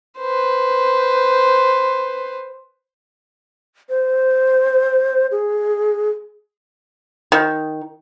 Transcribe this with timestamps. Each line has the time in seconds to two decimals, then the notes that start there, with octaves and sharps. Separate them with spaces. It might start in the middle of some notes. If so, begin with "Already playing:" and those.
0.19 B4 C5
3.89 C5
5.31 G#4
7.32 D#3